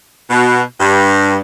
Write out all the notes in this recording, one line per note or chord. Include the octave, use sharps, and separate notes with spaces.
B2
G2